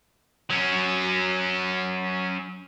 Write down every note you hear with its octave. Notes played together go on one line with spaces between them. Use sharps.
F#3 C#4